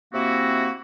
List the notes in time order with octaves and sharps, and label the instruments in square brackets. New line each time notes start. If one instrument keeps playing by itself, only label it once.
[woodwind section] C3 A#3 C4 E4 F#4